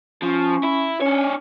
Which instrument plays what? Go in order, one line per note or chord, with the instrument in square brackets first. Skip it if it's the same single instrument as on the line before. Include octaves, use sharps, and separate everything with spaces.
[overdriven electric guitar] F3 [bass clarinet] C#4
[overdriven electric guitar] E4
[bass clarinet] C#4 [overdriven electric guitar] D4 C#5